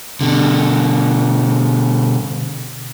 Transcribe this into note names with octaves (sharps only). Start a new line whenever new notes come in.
B2 D3